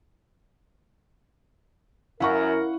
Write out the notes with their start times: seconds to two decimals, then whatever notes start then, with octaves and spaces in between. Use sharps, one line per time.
2.20 F#2 C#4 E4 A#4 F5 F#5 C#6